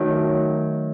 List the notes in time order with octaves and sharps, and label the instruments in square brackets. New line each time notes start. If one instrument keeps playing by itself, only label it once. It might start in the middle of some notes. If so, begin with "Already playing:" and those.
Already playing: [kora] D#3 F#3 A3